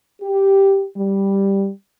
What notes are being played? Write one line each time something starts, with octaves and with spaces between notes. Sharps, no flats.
G4
G3